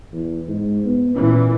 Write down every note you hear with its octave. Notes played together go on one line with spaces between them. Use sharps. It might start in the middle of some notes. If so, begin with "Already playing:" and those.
E2
G#2
B3
A#2 E3 C#4